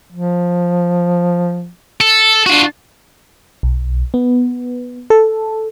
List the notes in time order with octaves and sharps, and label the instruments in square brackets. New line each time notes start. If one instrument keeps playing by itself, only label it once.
[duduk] F3
[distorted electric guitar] A4
[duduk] D4 [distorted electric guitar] F4 F#4
[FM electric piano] B1
B3
A4